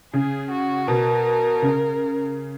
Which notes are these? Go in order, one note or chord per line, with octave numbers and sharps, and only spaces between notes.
C#3 G#4
F#4
B2 A#4
C#3